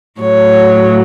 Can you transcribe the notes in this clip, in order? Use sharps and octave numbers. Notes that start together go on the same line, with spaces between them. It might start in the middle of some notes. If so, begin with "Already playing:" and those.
A2 F#3 C#5